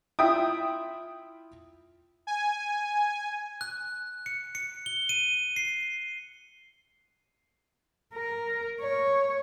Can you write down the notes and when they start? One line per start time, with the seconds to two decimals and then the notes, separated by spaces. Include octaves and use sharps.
0.19 E4 F4 E5 G5 D#6
2.27 G#5
3.61 F#6
4.26 C#7
4.55 C#7
4.86 G7
5.09 D#7
5.56 C7
8.14 A#4
8.81 C#5